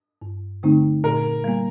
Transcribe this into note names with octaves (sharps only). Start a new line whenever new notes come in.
G2
D3 A3 C4 D#4
A#2 A#4
G3 A#3